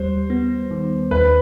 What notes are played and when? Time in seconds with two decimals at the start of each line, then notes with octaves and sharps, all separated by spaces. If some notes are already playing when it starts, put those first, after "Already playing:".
Already playing: D#2 G3 C5
0.30 B3
0.71 D#3
1.11 D#2 B4